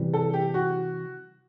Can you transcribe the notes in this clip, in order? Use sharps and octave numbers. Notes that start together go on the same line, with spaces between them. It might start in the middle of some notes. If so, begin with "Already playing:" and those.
Already playing: C3 E3 G3
A4
G4
F#4